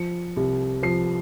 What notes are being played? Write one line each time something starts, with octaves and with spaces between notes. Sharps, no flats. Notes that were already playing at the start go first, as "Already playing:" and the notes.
Already playing: F3 C#7
C2
F3 C7